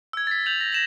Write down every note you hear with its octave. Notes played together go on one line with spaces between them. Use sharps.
E6 G#6
A6 B6
G6 F7 F#7
A#6
A#6 E7 F#7